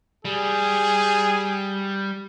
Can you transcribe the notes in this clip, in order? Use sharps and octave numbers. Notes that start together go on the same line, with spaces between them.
G3 G#4